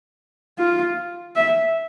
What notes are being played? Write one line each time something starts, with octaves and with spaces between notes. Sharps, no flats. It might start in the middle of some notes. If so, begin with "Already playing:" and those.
F4
E5